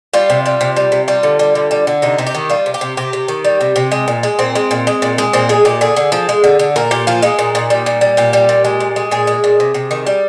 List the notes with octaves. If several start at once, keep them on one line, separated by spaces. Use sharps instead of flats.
G3 F4
C3
G3
C3
G3
C3
G3 F4
D3
G3
D3
G3
D3
C3 D#4
C3
G4
D#3
G3 F4
C3
G4
C3
C3 G4
C3
D#3
G3
C3
C3
G#3
A#2
G#3
A#2 C4
G#3
A#2
G#3
A#2
G#3
A#2 C4
G#3 G#4
A#2 G4
D3 G#4
D3
F3
G#3
D3
D3
A#2 A#4
A#2 G4
F3 F4
G#3 D#4
A#2
A#2
G3
A#2
G3
A#2 G4
G3
A#2
G#3
A#2
G#3
A#2 G#4
G#3
A#2
C3
C3
D#3
G3